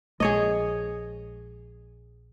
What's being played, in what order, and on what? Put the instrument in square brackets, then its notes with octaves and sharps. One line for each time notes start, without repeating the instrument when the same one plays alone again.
[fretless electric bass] A#1 G#3 [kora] G#4 C#5 D#5